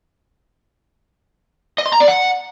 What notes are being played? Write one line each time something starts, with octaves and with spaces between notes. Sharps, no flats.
D#5
C6
A#5
D5
F#5